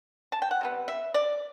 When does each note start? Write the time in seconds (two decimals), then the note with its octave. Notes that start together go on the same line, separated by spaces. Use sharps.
0.32 A5
0.42 G5
0.51 F#5
0.61 C3 G3 B3
0.88 E5
1.14 D5